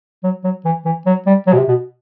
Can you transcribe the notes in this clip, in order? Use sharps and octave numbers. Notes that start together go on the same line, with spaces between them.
F#3
F#3
E3
E3
F#3
G3
F#3
B2
C3
B2